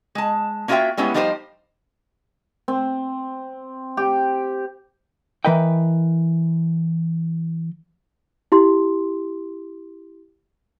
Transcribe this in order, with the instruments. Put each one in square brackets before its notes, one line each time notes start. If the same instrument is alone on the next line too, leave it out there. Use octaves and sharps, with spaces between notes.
[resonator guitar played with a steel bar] G#3 A5
A#3 C#4 F4 F#4 E5 G5
G3 G#3 B3 C#4 E4
F3 G3 D#4 G4 B4 C5
[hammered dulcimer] C4
G4
[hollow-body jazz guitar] E3 A#4 B4 D#5 G5
[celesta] E4 G4 C6